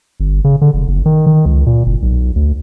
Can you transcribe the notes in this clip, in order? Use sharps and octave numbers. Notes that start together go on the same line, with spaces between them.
G1
C#3
D3
F1
F#1
D#3
D#3
C#2
A#2
F#1
B1
D2